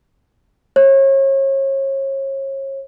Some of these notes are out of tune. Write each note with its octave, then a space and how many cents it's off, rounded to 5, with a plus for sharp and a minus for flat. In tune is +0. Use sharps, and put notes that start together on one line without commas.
C#5 -35